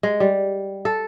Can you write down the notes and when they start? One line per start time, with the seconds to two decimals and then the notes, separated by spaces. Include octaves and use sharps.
0.03 G#3
0.20 G3
0.85 A4